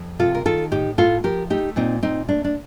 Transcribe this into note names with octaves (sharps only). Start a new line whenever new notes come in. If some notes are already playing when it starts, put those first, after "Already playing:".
Already playing: F2
C3 F4 A4
A#4
D#3 F4 A4
A2 D#4 G4
A2 F4 A4
F3 G4 A#4
A3 D#4 G4
A#2 C4 D#4
A#2 C4 D#4
A3 D4
D4